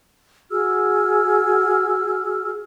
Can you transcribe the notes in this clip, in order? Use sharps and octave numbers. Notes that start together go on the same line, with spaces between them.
F#4 G#4 E6 F6